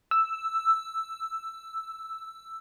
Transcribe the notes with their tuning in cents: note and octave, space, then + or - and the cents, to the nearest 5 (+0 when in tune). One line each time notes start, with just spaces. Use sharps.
E6 +0